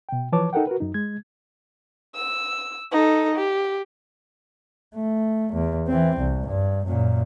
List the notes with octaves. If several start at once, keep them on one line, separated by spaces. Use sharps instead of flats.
B2 G5
E3 F3 B4 C#5 A5 D6
D#4 A4 A#4 F#5 G5
F#4 A#4 B4
F#2 D#4
G#3 G#6
E6
D#4 A4
G4
A3
E2
E3 C4
C2
G2
F#2 A#2